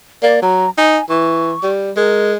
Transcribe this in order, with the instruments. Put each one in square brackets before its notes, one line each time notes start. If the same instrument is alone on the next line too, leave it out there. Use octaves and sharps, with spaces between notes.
[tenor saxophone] A#3 [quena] D5
[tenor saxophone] F#3 [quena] A#5
[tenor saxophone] D#4 [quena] G#5
[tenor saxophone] E3 [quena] C#6
[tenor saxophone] G3
[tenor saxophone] G#3 [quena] A#4